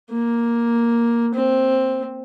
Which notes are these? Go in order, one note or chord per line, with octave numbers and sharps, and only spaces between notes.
A#3
C4